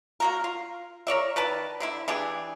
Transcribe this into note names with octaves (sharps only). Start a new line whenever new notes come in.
A#3 F#4 A#4
F4
A#4 C#5 D5 E5
D#3 B4 D5 A5
D3 D4 E4
E3 D4 G4 G#4